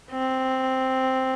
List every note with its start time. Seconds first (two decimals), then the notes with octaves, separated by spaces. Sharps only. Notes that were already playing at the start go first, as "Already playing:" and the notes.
0.11 C4